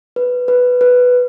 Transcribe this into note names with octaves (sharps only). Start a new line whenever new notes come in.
B4
B4
B4